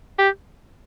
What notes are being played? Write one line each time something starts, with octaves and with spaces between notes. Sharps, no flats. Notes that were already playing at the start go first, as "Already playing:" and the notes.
G4